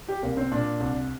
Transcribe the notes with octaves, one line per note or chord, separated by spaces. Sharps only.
G4
C2 A#3
C4
A#2 D4
C2